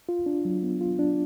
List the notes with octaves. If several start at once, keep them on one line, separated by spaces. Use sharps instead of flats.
F4
D4
F#3
B3
F4
D4